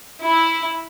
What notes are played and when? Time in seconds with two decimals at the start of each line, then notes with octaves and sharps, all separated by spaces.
0.21 E4